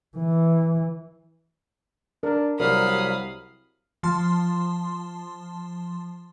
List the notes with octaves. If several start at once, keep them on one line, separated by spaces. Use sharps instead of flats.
E3
D4 A#4
C2 F#3 A#4 D5 F5 B5 D#6
F3 A5 C6